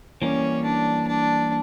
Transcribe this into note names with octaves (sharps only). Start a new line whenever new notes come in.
E3 G3 A#3 C#4
D4
D4